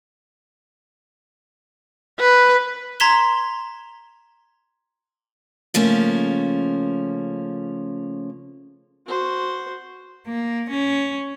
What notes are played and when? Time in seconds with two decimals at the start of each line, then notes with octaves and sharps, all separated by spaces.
2.20 B4
3.00 A#5 C6 G#6 B6 E7 G7
5.74 C#3 F3 A3 A#3 C#4
9.07 F#4 C5
10.27 A#3
10.70 C#4